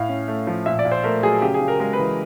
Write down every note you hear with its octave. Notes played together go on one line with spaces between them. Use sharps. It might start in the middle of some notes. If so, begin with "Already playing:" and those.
Already playing: A2 F5
C#4
A3
F3
A#2 E5
D5
A#2
C5
A3 A#4
F#3 G#4
C#3 G4
G#4
C#3
A#4
G#3 A#4
B4
E3